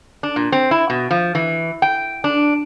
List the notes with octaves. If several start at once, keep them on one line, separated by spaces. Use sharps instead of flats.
D4
A#2
C4
E4
B2
F3
E3
G5
D4